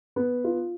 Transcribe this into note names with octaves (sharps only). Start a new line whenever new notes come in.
B3
F4